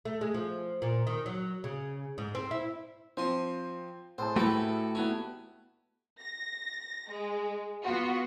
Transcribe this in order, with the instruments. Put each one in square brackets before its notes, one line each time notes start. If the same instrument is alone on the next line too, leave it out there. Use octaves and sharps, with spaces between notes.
[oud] A3
G#3
F3
A#2
D#3
F#3
C#3
G#2
C4
E4
[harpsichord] F3 C6 D#6 [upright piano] C4
[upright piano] A2 G#4 A5 [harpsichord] C5
[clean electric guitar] A3 F#4 G4 [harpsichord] E4 B4
[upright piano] B3 E4 [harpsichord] C#4 D4
[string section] A#6
G#3
B3 F4 F#4